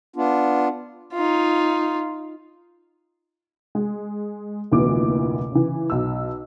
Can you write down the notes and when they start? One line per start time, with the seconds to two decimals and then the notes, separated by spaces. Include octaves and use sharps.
0.16 B3 D4 F4
1.13 D#4 F4
3.75 G#3
4.72 F1 D2 A#2 E3 B3 D6
5.51 C#3 E3
5.90 B1 E6